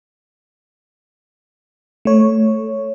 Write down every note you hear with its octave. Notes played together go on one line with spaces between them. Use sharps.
A3 C#5